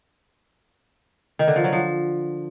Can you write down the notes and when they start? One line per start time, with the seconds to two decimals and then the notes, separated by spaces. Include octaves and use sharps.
1.39 D#3
1.48 D3
1.56 F3
1.64 F#3
1.72 F3